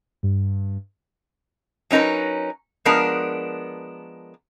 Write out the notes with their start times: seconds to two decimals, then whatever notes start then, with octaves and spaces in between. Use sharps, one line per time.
0.23 G2
1.91 F#3 C#4 D#4 A#4 B4
2.85 F3 G#3 B3 D4 A#4